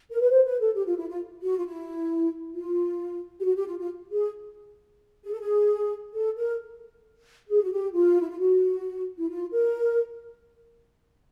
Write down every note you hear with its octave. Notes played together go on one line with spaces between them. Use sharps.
A#4
B4
C5
B4
A4
G4
F4
E4
F4
F#4
F4
E4
F4
G4
F#4
G4
F4
F4
G#4
G#4
A4
G#4
A4
A#4
G#4
F#4
G4
F4
E4
F4
F#4
E4
F4
A#4